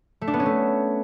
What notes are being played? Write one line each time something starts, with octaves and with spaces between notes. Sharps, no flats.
A3
D4
B3
C#4
A3